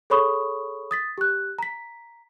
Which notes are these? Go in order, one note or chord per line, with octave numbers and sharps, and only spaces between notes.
G#4 A4 C#5 B5 C#6 D#6
D#6 A6 B6
G4 F#6
A#5 B6